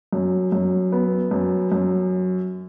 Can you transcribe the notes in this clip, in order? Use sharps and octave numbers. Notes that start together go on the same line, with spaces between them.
F#2
F#2
B3
F#2
F#2